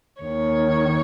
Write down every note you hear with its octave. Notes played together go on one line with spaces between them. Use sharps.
D#2 D#3 C#5